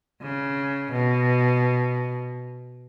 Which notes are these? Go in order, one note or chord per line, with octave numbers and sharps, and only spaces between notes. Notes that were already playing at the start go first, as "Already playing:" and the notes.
C#3
B2